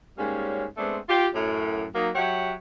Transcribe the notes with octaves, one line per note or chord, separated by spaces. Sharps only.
G#2 G3 A#3 C#4
G#3 A3 B3 C4 D4
F4 G4
F#2 A2
F#3 A#3 D#4
F#3 G4 C#5 E5 F#5